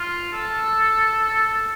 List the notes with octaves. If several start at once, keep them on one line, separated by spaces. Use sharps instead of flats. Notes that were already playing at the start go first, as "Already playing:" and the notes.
Already playing: F4
A4